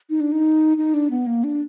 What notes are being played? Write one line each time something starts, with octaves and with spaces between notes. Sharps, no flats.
D#4
D4
D#4
D#4
D4
B3
A#3
D4